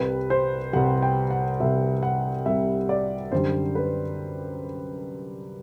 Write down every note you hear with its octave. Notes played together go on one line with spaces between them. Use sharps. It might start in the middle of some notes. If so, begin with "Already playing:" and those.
Already playing: C2 C3 G3 B4
C5
C2 C3 G3 F#5
G5
F#5
C2 C3 G3 E5
F#5
C2 C3 G3 E5
D5
F#2 D3 G3 C5
B4